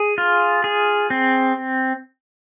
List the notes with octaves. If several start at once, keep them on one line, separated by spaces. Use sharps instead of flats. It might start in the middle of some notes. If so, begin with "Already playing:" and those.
Already playing: G#4
F4
G#4
C4